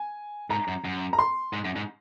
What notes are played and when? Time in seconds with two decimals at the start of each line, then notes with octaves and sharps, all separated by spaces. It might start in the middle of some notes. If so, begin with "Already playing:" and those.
Already playing: G#5
0.50 G#2 A#5
0.68 F#2
0.85 F#2
1.13 A#5
1.19 C6
1.53 G#2
1.65 F#2
1.76 G#2